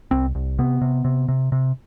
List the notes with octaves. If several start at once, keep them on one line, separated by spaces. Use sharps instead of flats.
C2 C4
C2
C3 B3
C3
C3
C3
C3